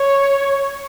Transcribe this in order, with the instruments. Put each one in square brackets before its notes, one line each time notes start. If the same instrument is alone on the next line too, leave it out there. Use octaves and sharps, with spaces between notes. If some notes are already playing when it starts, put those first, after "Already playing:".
Already playing: [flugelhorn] C#5